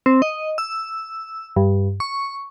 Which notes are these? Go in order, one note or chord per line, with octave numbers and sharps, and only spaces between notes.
C4
D#5
E6
G2
C#6